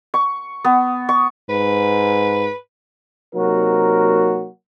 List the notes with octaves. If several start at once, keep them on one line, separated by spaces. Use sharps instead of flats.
C#6
B3
C#6
G#2 B4
C3 F#3 A#3 D#4 F#4 A#4